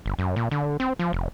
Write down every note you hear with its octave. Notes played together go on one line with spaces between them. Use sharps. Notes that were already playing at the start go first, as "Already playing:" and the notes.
G1
F#2
A#2
D3
C4
F3
F1